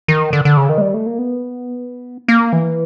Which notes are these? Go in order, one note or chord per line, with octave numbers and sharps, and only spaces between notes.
D#3
D3
D3
C#3
D#3
G#3
G3
A3
A#3
B3
A#3
E3